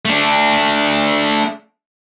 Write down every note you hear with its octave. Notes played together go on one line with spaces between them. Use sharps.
A3 D4